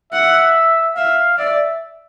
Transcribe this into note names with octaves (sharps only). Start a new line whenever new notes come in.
E5 F#5
E5 F5
D5 E5